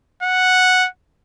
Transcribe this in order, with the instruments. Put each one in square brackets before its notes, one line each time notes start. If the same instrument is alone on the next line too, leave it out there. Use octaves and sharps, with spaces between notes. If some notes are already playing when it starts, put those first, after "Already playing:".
[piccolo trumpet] F#5